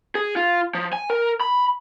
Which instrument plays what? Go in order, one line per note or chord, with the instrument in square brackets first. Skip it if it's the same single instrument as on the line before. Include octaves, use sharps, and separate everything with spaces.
[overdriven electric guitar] G#4
F4
F3
G#5
A#4
B5